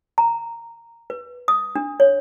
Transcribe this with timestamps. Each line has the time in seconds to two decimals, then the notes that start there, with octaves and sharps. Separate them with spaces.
0.18 A#5
1.10 B4
1.48 D#6
1.75 D4
2.00 C#5